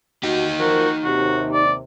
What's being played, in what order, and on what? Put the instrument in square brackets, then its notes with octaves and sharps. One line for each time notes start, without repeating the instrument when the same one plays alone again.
[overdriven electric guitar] D#4 G4 [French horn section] F#4
[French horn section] F3 F4 A#4 [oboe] F#4
[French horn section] D#2 C3 [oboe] F#4
[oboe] D5